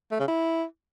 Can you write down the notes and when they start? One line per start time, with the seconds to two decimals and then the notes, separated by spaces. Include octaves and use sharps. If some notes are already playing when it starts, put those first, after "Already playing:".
0.12 A3
0.20 C#3
0.28 E4